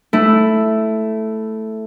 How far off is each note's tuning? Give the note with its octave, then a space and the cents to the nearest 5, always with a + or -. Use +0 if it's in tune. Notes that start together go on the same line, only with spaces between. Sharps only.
A3 +0 E4 +0